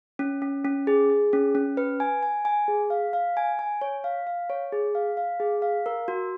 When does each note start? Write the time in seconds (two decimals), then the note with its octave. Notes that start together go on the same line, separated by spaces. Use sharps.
0.19 C#4
0.42 C#4
0.65 C#4
0.87 G#4
1.10 G#4
1.33 C#4
1.55 C#4
1.77 B4
2.00 G#5
2.23 G#5
2.45 G#5
2.68 G#4
2.90 F5
3.13 F5
3.37 G#5
3.59 G#5
3.81 C#5
4.04 F5
4.27 F5
4.50 C#5
4.72 G#4
4.95 F5
5.17 F5
5.40 G#4
5.62 F5
5.86 A#4
6.08 F#4